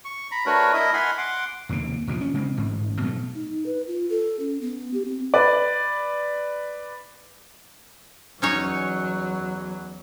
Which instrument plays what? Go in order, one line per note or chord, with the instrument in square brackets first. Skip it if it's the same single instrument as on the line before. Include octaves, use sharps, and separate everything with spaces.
[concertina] C#6
A#5 B5
A3 D4 F#4 A#4 B4 C#5
E4 A#4 D#5 E5 D#6
F#5 G#5 B5 C6 F6
F#5 C6 D6
[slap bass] F1 D#2 C#3 A#3
F1 A#1 B2 F3
C#4
C#3 G#3 C4
A1 G#2
B2 F#3 A3
[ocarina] D#4
B4
F4
A4
C#4
B3
G4
C4
[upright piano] B4 D5
[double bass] E2 F#3 [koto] C#4 D#4 C#5